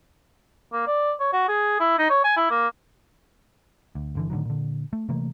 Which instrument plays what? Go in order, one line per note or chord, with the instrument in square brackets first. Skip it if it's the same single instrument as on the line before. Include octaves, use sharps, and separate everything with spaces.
[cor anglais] A#3
D5
C#5
F#4
G#4
E4
D#4
C#5
G#5
E4
A#3
[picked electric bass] D2
G1 D3 E3
A2 D3 D#3 F#3
A#2 D3
A3
C3 E3 A3 A#3